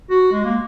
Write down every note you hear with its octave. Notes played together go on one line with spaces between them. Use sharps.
F#4
G#3
A#3